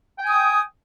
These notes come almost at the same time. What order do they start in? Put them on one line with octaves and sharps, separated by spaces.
G5 G#5 D#6